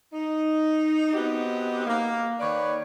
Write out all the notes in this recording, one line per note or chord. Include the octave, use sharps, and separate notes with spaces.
D#4
B3 C4 D#4 F#4 G4
A#3
D#3 B4 C#5 D5